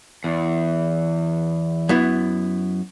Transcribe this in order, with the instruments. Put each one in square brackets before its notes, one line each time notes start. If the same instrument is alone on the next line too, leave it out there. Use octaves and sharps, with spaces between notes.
[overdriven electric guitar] E2
[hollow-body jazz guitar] F#2 B3 E4